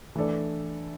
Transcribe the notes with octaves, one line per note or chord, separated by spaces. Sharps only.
E3 A3 D4 A4 D5